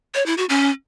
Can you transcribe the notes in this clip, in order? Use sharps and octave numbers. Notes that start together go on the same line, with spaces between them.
C#5
E4
F#4
C#4